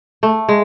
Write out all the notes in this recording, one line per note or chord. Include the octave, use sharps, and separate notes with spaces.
A3
G#3